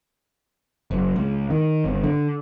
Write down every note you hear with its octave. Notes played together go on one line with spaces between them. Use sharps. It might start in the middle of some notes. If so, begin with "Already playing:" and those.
F#1
C#2
D#3
G1
D3